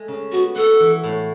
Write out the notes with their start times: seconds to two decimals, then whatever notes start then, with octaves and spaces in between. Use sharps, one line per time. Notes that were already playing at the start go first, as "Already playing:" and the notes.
Already playing: G#3 A3 G#4
0.08 C#3
0.32 B3 F#4
0.56 F#4 A4
0.80 E3
1.03 A2